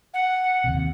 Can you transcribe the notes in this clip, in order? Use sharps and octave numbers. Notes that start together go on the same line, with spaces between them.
F#5
D#2 C3